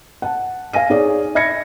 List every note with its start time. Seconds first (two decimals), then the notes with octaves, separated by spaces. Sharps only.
0.22 F#5 A5
0.73 F5 G#5 A#6 D#7
0.90 D#4 G#4 C#5 D5
1.35 D#5 E5 B5 G#6 A#6 C#7